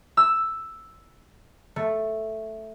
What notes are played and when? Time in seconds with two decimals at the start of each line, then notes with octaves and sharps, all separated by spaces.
0.17 E6
1.76 A3